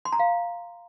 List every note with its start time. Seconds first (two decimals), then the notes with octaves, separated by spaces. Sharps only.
0.05 C6
0.12 A#5
0.19 F5